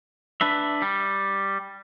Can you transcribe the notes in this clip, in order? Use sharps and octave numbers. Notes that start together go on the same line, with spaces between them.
D4 B4 E5
G3